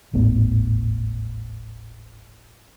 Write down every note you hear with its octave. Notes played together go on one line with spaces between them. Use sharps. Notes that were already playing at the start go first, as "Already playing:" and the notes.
D#1 G#1 A2 B3